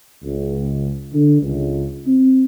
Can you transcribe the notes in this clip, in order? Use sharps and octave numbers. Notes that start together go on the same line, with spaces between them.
C#2
D3
C#2
C4